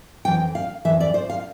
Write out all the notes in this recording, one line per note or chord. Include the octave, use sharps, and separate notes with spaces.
F2 E3 G5
F5
F2 E3 E5
D5
C5
F5